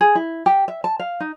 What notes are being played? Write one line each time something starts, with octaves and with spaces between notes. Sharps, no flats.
G#4
E4
G4
E5
A5
F5
D#4